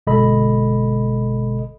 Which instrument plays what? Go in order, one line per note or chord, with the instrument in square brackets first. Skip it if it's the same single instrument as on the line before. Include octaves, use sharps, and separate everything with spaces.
[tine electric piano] G1 B2 G#3 A4 D#5 B5